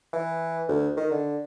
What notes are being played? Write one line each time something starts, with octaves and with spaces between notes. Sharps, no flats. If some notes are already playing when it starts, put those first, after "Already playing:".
E3
D2
D#3
D3